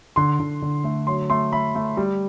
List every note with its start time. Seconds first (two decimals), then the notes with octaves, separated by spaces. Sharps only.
0.16 D3 C6
0.40 D3
0.62 D3
0.84 A3
1.07 F#3 C6
1.30 A3 C6
1.53 A3 B5
1.75 A3
1.97 G3